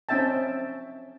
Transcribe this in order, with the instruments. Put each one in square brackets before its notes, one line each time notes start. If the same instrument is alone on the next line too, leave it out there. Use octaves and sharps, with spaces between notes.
[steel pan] C4 C#4 D#4 E5 G5 A5